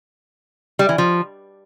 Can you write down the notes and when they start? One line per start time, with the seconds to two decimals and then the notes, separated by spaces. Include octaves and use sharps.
0.79 G3
0.89 E3
0.98 F3